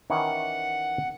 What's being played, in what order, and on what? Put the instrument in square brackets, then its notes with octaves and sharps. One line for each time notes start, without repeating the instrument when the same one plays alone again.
[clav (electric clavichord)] D#3 E3 C#4 [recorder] F#5